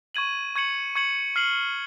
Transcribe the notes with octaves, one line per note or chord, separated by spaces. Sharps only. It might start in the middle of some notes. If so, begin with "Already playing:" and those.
C#6 G#6 D#7 F#7
C#6 G#6 C#7 F#7
C#6 G#6 C#7 F#7
F6 C7 F#7